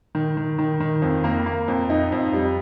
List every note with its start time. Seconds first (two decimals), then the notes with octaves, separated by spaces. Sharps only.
0.15 D#3
0.37 D#3
0.59 D#3
0.80 D#3
1.02 F2
1.24 A#3
1.46 A#3
1.68 F2
1.90 D#4
2.12 F2
2.33 G3